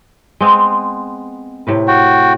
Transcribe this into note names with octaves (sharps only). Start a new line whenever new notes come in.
G#3 B3 C4
A2 C3 B4
F#4 G5